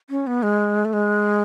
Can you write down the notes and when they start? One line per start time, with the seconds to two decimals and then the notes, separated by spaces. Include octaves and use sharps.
0.10 C#4
0.27 B3
0.43 G#3
0.85 A3
0.93 G#3